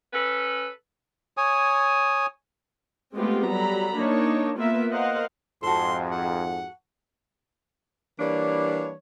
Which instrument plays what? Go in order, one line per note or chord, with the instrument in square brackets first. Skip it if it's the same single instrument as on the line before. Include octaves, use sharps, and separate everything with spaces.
[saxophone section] C#4 A4 B4
[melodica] C#5 G#5 D#6
[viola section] G#3 A3 B3 C4 F4 G4
F#3 G3 A4 A#5 B5
A#3 D4 D#4 C#5
A#3 B3 F4 A#4 B4 E5
A#4 C5 D#5 F5 F#5
[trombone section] F2 G#2 [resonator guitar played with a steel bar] F#4 A4 [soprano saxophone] C6
[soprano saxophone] F#5
[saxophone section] E3 G3 A#3 D4 C#5